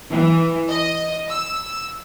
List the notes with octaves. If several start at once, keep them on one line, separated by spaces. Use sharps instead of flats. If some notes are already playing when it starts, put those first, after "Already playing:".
E3
D#5
E6